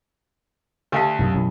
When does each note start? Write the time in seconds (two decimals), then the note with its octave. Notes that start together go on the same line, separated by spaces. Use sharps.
0.92 D2 G4 F5 A5
1.19 F#2 B2
1.32 F#2 B2 E3